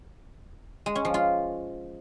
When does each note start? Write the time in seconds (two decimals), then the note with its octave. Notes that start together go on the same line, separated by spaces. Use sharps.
0.86 G#3
0.95 C#4
1.05 F3
1.14 F4